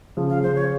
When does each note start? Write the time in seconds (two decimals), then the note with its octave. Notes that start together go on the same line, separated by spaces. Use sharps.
0.17 C#3 F3
0.30 F5
0.43 C#3 F3 C5
0.55 C#5